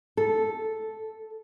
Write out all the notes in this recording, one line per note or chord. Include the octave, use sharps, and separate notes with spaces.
A4